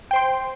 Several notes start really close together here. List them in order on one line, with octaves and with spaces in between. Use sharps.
G5 C5 C6